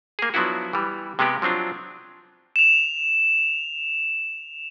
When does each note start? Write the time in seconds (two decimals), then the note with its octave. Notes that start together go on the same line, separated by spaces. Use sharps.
0.19 A#3 G#4
0.34 F3 F#3 B3 D4 E4 F#4
0.73 E3 G3
1.19 C3 G#3 B3 G4
1.42 F3 F#3 C4 D4 F4
2.56 E7 F7